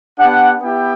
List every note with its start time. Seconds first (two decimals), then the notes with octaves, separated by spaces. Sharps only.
0.16 B3 D4 G4 F#5
0.61 B3 E4 G4 G5